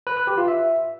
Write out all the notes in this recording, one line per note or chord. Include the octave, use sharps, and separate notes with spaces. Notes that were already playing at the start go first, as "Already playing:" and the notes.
B4
B4
G4
F4
E5